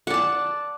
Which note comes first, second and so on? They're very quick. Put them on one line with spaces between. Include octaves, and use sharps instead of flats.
F#5 D5 A5